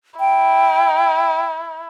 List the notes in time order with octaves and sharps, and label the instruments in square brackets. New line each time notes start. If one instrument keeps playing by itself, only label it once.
[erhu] E4 [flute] G5